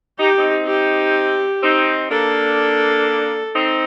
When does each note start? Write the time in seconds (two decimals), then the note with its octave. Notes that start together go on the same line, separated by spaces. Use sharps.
0.19 D#4 G4
0.39 C4 D#4
0.67 G4
1.63 C4 D#4
2.11 A#3 D4 A4
3.56 C4 D#4